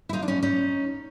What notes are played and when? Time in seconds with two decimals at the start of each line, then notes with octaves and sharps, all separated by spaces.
0.09 E4
0.13 D#4 F4
0.22 D4
0.28 C#4 D#4
0.43 C#4 D#4